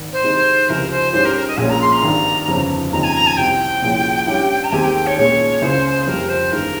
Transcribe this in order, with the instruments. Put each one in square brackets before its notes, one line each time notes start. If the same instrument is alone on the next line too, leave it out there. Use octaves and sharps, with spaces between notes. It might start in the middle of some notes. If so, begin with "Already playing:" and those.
Already playing: [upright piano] G#1
[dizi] C5
[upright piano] C3 D#3 G#3 D#4
[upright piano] C#2 C3 F3 [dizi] A#4
[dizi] C5
[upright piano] G#2 G3 C#4 G4 [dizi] C5
[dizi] A#4
A#4
D#5
[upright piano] A#1 A#2 G#3 C#4 [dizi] G#5
[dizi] A#5
C6
A#5
[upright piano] G#1 G2 D#3
G1 F2 C#3
[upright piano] D#2 C#3 F3 C4 D#4 [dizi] A#5
[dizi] G#5
A#5
G#5
[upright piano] C2 C3 G3 C4 [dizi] G5
[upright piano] C2 A#2 F3 G#3 C#4
G2 G3 C#4 G4
[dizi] A#5
[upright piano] D#2 D#3 G#3 C4 G4 [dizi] G#5
[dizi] G5
G5
C#5
[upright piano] A#2 G#3 C#4 [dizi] C#5
[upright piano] C#2 C#3 G#3 [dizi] C5
[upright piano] F2 C3 G3 C4 [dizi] A#4
[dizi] C5
[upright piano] G1 G2 D#3 G#3 [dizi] A#4